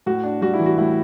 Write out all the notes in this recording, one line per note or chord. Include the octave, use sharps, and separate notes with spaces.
A2 F#4
D4
G3 F#4
E4
E3
F#4
A2 E4